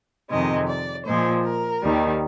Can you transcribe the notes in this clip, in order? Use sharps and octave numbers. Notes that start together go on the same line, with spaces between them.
F2 C3 D#3 G#3 D#5
D5
A#2 F3 G#3 C5
A#4
D#2 D#3 G3